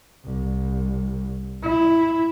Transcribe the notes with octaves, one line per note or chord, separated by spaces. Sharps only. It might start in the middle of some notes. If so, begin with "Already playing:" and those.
C2
E4